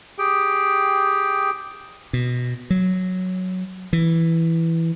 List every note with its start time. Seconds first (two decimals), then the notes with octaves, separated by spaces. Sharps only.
0.18 G4 G#4 G5
2.13 B2
2.70 F#3
3.93 E3